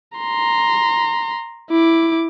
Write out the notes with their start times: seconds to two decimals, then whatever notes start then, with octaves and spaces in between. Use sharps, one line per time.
0.18 A#5 C6
1.70 E4 D6